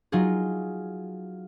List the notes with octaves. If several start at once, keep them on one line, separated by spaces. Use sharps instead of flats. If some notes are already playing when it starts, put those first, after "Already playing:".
F#3 D#4 F4 G#4